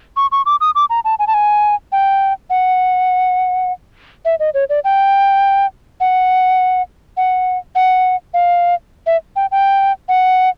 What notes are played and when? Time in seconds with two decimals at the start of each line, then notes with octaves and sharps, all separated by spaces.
0.17 C#6
0.32 C#6
0.46 D6
0.61 D#6
0.75 D6
0.90 A#5
1.05 A5
1.19 G#5
1.27 A5
1.34 G#5
1.92 G5
2.50 F#5
4.25 E5
4.40 D#5
4.54 C#5
4.69 D5
4.84 G5
6.00 F#5
7.17 F#5
7.75 F#5
8.34 F5
9.06 E5
9.36 G5
9.51 G5
10.09 F#5